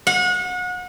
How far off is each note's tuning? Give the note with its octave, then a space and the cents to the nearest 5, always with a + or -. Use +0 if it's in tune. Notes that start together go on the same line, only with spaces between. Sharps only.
F#5 -35